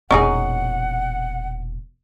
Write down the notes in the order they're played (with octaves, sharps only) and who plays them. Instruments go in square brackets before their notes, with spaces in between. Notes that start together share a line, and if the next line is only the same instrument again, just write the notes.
[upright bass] E1 A#2 [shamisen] C#4 D#4 G#4 [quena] F#5